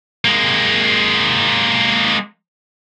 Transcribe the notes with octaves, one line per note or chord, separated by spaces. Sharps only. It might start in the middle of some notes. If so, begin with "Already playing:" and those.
G#3 A#3